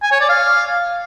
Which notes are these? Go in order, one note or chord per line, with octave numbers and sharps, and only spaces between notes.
G#5
C#5
D5
F5